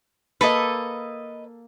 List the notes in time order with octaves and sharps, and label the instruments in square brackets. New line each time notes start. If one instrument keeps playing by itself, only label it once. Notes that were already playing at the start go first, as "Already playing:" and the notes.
[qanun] A#3 A4 [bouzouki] B4 D#5